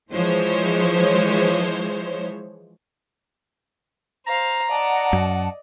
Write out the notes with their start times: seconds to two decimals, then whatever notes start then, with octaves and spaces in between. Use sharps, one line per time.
0.12 E3 F3 G#3 C5 C#5
4.27 C5 F5 A#5
4.70 D5 D#5 F#5 A5
5.13 F#2